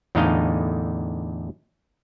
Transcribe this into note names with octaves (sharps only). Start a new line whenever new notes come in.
E2 A2 D3 D#4 D#5 F5